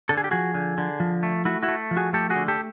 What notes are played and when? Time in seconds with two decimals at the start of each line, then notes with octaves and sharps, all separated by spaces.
0.09 D3 A4
0.17 G#4
0.24 G4
0.31 F3 F#4 G#4
0.54 D3
0.78 D3
1.00 F3
1.23 A3
1.45 A3 E4 F#4
1.63 E4 F#4
1.68 A3
1.91 F3
1.97 F#4 G#4
2.13 A3 G4 A4
2.30 F#4 G#4
2.36 D3
2.48 G4 A4